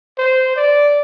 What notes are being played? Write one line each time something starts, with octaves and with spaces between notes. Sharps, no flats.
C5
D5